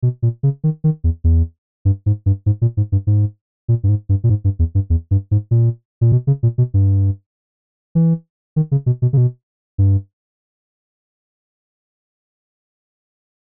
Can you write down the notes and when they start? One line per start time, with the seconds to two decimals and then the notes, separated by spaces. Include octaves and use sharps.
0.03 B2
0.22 A#2
0.43 C#3
0.64 D#3
0.84 D#3
1.04 E2
1.24 E2
1.85 G2
2.06 G#2
2.26 G2
2.46 G#2
2.62 A#2
2.77 G#2
2.92 G2
3.07 G#2
3.68 A#2
3.83 G2
3.89 G#2
4.09 G2
4.24 A#2
4.30 G#2
4.44 G2
4.59 E2
4.75 G2
4.90 E2
5.11 G2
5.31 G#2
5.51 A#2
6.01 A#2
6.12 B2
6.27 C#3
6.43 A#2
6.58 B2
6.74 G2
7.95 E3
8.56 D#3
8.71 C#3
8.86 B2
9.02 B2
9.13 C#3
9.17 B2
9.78 G2